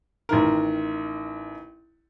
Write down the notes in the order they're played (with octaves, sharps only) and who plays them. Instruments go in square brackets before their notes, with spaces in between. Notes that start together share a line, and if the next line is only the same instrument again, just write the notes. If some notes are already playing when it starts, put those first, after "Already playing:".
[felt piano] A1 D#3 A#4